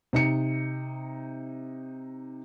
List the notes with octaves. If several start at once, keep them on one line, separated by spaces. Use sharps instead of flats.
C3 D#4 C#7